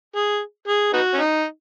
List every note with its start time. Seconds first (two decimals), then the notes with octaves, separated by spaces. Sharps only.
0.16 G#4
0.68 G#4
0.93 B3 D#4 F#4
1.14 C#4
1.20 D#4